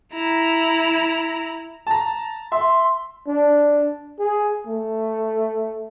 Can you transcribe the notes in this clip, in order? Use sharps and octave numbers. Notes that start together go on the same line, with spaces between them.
E4 A#5
A5 A#5
E5 C6
D4
G#4
A3